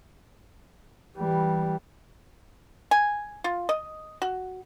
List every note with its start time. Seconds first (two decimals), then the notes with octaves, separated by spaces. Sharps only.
1.17 E3 G3
2.91 G#5
3.44 F4
3.69 D#5
4.22 F#4